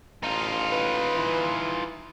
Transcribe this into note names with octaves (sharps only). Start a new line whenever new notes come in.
A1 D#4 F4
B4
E3